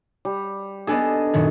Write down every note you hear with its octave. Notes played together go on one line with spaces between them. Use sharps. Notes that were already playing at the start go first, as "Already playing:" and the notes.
G3
B3 D4 G#4 A4 D#5
F#2 A#2 D#3